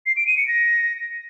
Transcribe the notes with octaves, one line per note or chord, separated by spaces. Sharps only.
C7
D7
D#7
C#7
A#6